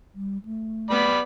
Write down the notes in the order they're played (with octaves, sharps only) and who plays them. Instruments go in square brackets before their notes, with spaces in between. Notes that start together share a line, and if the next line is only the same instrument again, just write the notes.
[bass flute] G3
A3
[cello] B3 [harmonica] D5 B5